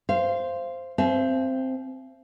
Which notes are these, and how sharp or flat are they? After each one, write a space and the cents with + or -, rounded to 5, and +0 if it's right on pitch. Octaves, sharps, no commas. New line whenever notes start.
C5 +0 F5 -25
C4 +0 E5 +45 A5 -45